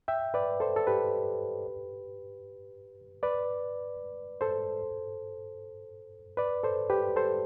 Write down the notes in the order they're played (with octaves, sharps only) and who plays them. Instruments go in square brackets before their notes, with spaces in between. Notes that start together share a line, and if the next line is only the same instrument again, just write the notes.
[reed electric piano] E5 G5
B4 D5
A4 C5
A4
G4 B4
B4 D5
A4 C5
B4 D5
A4 C5
G4 B4
A4 C5